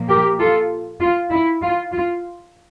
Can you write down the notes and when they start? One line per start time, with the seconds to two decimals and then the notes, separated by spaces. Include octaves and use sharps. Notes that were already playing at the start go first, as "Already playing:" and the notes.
Already playing: A#2 F3 A#3
0.09 G4 A#4
0.41 F4 A4
1.01 F4
1.31 E4
1.62 F4
1.92 F4